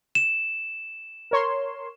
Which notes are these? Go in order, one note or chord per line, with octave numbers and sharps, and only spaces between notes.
E7
A#4 C#5 C6